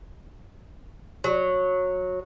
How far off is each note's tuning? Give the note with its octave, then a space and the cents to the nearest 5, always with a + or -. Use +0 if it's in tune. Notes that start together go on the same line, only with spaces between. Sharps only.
F#3 -15